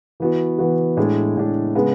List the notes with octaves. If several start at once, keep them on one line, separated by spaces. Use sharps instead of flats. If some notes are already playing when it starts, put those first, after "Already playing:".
E3 B3 F#4
E3 B3 F#4
A2 G#3 D4
A2 G#3 D4
C#3 G#3 B3